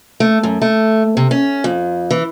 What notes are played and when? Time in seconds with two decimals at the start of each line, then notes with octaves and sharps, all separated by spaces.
0.20 A3
0.43 F#2
0.62 A3
1.17 C3
1.31 C#4
1.64 F2
2.11 E3